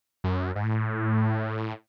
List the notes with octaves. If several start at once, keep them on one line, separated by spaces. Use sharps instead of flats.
F#2
G#2
A2